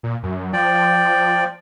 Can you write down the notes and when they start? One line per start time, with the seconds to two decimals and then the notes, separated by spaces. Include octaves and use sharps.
0.03 A#2
0.23 F#2
0.53 F3 D5 G5